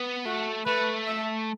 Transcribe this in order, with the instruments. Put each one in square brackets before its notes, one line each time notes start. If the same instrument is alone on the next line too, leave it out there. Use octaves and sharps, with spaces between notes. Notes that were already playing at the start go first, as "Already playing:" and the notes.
Already playing: [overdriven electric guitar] B3
[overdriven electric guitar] A3 [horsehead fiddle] F#4
[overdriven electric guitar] A3 [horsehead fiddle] B4
[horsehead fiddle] E5